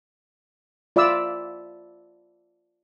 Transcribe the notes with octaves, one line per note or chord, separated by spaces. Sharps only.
F4 D5 E5 B5 D6 E6